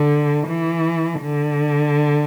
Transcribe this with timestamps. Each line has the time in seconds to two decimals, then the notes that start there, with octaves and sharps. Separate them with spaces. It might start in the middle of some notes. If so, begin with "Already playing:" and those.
Already playing: D3
0.46 E3
1.22 D3